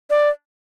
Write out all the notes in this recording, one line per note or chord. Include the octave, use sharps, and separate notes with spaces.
D5